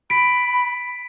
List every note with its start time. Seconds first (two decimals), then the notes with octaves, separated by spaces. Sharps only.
0.10 B5 B6 D7